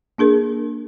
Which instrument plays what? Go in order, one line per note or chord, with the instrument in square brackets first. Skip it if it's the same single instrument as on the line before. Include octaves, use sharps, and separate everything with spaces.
[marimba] A#3 D4 G#4 A#4